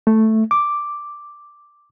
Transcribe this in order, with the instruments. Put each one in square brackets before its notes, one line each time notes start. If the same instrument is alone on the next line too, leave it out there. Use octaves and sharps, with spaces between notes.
[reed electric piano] A3
D6